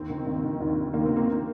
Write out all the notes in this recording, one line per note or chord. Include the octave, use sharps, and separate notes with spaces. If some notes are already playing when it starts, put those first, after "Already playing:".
Already playing: D#2 C4
D#3
D#2
D#3
D#2
D#3
D#2 A#3
C4
D#3
A#3